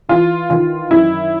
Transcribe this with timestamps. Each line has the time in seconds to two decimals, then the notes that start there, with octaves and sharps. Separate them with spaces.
0.09 E3 F4
0.50 D#3 F4
0.91 F#2 E4